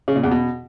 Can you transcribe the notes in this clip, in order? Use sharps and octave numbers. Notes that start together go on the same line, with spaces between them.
C#3
A#2
E2
B2